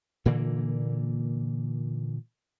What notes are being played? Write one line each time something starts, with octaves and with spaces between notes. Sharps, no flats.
A#2 D3 E3 A#3